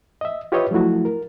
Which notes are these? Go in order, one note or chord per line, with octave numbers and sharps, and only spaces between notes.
D#5 E5
F4 G4 B4 C#5 D#5 E5
F3 F#3 A3 E4 F#4
A#4